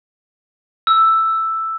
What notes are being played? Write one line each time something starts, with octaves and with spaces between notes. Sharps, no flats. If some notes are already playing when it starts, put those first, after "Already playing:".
E6